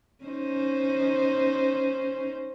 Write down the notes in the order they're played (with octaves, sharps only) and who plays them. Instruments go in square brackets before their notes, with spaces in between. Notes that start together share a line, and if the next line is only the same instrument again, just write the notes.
[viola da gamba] C#4 D#4 C5